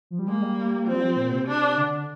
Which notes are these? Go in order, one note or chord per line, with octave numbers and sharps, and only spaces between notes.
F3
G3
G#3 A#3
G3
F3 C4
G3
F3
A#2
C3
C3 D4
D3